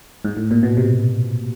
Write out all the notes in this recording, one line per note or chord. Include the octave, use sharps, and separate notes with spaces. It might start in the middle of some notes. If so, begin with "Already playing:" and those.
G#2
A2
A#2
B2
C3